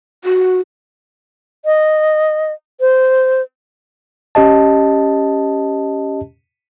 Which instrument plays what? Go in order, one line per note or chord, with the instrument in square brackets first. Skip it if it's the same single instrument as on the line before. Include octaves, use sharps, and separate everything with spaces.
[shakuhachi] F#4
[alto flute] D#5
C5
[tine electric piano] C#4 G4 D#5 A5